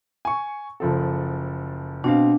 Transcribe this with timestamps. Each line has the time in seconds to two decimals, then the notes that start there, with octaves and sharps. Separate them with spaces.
0.25 G#5 C#6
0.80 F#1 F3 A4
2.04 B2 C4 D4 F5